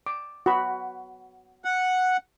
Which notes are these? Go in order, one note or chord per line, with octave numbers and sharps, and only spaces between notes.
D6
F#4 B5
F#5